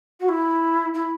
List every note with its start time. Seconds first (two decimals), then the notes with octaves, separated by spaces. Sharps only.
0.20 F#4
0.29 E4
0.94 E4